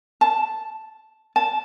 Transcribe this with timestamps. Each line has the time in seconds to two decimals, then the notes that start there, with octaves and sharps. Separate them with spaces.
0.21 A5
1.36 A5